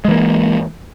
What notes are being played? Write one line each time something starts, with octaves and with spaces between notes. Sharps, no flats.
E3 G#3 A#3